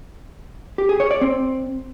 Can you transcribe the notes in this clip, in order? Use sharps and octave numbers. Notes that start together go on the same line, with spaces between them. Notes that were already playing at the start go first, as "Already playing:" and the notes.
G4
G#4
C#5
D5
C4